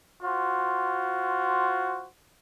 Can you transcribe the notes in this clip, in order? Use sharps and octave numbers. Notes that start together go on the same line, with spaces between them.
F4 F#4 C5